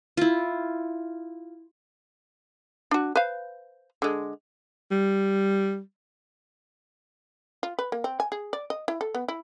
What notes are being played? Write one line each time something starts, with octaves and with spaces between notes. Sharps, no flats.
E4 F4
D4 F#4
B4 C5 F5
D3 G#3
G3
F4
B4
A#3
C4
G#5
G#4
D5
D#5
E4
A4
B3
E4